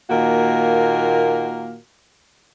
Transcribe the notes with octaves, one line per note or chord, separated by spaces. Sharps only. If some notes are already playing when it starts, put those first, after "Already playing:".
A#2 D#3 A#3 F#4 A#4